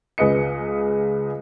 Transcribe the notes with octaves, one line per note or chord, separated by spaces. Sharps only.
C#2 G#4 B4 D#5 C#7